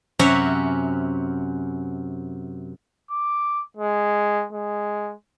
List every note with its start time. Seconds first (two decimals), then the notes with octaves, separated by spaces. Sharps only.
0.19 F#2 C3 C#4 F#4 C#5 E5
3.11 D6
3.77 G#3
4.53 G#3